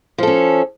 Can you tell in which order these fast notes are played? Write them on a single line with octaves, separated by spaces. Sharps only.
F3 A4 C#4